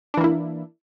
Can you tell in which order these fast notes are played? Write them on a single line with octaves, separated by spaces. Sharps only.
D4 E3 A#3 E4